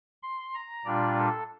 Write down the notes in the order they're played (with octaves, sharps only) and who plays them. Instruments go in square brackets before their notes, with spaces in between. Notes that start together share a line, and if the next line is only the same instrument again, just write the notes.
[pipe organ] C6
A#5
A#2 G3 D4 F4 D5
A4